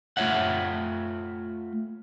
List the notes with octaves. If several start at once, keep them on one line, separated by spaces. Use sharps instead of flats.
A3 F4 C#5 E5 F#5